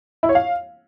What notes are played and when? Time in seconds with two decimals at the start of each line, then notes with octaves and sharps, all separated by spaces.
0.23 E4
0.29 C#5
0.35 F5